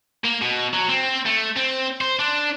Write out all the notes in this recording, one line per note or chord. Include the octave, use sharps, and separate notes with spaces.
A#3
B2
F#3
C4
A3
C4
C5
D4